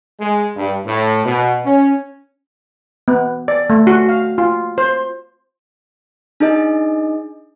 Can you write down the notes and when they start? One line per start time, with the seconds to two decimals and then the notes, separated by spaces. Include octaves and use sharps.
0.21 G#3
0.57 G2
0.86 A2
1.25 B2
1.66 C#4
3.08 B3
3.48 D5
3.70 A3
3.87 F#4
4.09 F5
4.38 F4
4.78 C5
6.40 D4 D#4 G#4 D#5